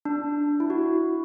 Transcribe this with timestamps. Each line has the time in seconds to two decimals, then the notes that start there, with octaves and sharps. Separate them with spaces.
0.05 D4
0.60 E4
0.70 F#4